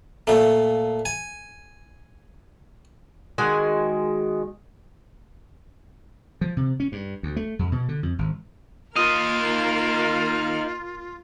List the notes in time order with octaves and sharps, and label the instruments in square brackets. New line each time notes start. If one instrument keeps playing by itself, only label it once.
[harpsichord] A#2 A3
G#5
[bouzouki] D#3 G#3 F#4 G#5
[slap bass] F3
C3
C#4
G2
D2
A3
F2
B2
D3
F2
G#1
[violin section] A#3 A#4 F6 [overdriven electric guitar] D#4 F5 [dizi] F4 [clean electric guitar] D#5